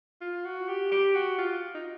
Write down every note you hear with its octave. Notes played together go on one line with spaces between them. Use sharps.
F4
F#4
G4
G4
F#4
F4
D#4